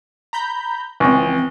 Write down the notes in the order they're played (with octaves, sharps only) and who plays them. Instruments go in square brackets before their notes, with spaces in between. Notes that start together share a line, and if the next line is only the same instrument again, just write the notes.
[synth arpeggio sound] A#5 B5 G6
[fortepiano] C#2 [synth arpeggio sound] E3 F3 C4